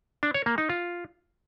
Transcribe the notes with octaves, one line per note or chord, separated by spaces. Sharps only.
D4
C#5
A#3
D#4
F4